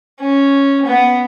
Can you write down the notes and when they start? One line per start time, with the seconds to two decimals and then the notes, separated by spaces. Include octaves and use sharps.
0.19 C#4
0.85 B3